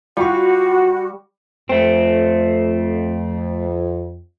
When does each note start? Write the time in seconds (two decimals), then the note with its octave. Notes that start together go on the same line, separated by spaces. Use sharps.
0.17 G3 F4 F#4 C#6
1.69 F2 A3 C4